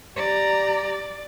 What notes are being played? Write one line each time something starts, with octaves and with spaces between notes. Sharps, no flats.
G4 D5 A#5